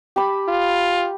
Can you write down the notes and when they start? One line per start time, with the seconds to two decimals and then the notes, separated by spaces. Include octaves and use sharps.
0.16 G4 A5 B5
0.48 F4